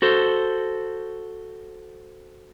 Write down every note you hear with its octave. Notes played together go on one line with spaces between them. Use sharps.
F#4 A4 C5